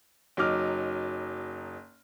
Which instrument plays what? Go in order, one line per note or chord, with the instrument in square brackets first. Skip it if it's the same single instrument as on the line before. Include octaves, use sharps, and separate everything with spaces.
[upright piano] F#1 F#3 D#4 D6 F6